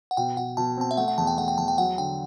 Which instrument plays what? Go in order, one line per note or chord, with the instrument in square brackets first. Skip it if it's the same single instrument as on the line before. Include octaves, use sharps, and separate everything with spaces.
[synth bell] F#5
[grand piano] B2 [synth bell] G5
[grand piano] B2 [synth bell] F#5
[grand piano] B2 [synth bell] A5
[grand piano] C4 [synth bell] A5
[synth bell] E5
[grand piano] A3 [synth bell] F#5
[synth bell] F#5
[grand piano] E2 [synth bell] A5
[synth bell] G5
[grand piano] A3 [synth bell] F#5
[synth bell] G5
[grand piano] E2 [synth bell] A5
[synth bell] G5
[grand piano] F#3 [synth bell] F#5
[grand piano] D3 [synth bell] G5